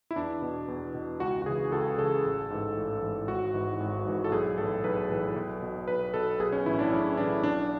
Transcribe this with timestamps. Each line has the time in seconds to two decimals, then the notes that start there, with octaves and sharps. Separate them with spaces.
0.11 E4
0.16 E2 D4
0.42 B2
0.68 E2
0.95 B2
1.20 C#2 F#4
1.42 F#4
1.46 C#3 G#4
1.50 E3
1.72 C#2 A4
1.98 C#3 E3 A4
2.24 A1
2.50 G#2 E3
2.77 A1
3.02 G#2 E3
3.28 G#1 F#4
3.54 G#2 E3
3.80 G#1
4.06 G#2 E3
4.24 A4
4.32 B1 G#4
4.58 A2 E3 A4
4.84 B1 B4
5.10 A2 E3
5.36 B1
5.62 B2
5.88 B1 B4
6.14 B2 A4
6.39 B1 G#4
6.52 C#4
6.66 A2 E3 E4
6.79 D4
6.92 B1 C#4
7.17 A2 E3 D4
7.43 B1 D4